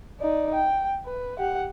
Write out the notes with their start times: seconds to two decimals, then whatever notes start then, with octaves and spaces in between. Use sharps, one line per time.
0.20 D#4 D5
0.54 G5
1.05 B4
1.39 G4 F#5